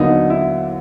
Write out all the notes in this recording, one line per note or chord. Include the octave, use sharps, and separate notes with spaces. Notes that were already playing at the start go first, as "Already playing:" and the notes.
Already playing: D#2 D3 F#3 B3 D#4
E4